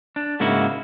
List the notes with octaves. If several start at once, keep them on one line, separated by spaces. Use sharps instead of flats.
D4
G#2 C#3 A#3 D#4 E4 F#4